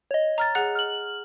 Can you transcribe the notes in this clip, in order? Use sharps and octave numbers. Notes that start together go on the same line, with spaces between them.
C#5 D#5
A#5 F6 A6
G#4 F#5 F#6
F6 F#7